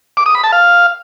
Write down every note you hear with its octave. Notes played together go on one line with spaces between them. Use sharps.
D6
D#6
B5
A5
F5